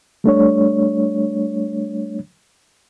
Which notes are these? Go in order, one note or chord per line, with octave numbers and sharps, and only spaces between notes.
G3 A3 D4 C#5